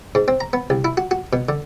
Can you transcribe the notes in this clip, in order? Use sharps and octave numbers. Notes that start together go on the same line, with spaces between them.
G#2
C4
A#5
B3
C2
E4
F#4
F#4
B2
D3